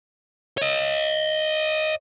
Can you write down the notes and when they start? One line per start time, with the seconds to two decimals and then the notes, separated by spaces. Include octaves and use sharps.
0.58 C#5 D#5